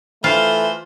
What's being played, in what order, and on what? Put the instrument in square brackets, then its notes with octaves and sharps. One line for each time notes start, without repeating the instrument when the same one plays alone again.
[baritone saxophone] E3 [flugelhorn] A3 [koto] F4 [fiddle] C5